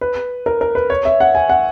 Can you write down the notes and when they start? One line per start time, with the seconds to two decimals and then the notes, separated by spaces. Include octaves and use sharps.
0.01 B4
0.46 A#4
0.61 A#4
0.75 B4
0.90 C#5
1.05 E5
1.20 F#5
1.35 G#5
1.49 F#5